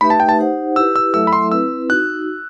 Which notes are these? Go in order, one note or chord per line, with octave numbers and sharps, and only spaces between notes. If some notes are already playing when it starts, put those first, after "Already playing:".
A3 D#4 G4 B4 E5 B5
A5
G5
A5
D#4 G4 C5 F#5
E4 G4 B4 E6
E6
F#3 A3 E4 A4 E5 E6
B5
C6
C4 E4 B4 E6
D#4 F#4 F#6